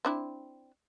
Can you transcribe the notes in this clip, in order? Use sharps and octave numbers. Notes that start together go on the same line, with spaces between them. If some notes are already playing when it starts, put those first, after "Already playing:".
C4 D4 E4